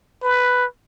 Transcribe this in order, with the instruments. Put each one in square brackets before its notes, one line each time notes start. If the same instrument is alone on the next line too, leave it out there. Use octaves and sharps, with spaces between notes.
[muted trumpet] B4